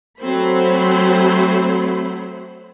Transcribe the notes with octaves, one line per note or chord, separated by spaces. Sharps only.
F#3 A3 C4 C5 B5